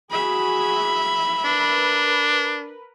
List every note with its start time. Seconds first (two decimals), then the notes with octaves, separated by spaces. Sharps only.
0.10 F#4 G#4 E5 B5
1.45 D4 A#4 B4